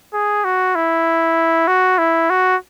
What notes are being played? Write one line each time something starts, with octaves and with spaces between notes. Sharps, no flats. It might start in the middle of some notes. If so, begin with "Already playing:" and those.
G#4
F#4
E4
F#4
E4
F#4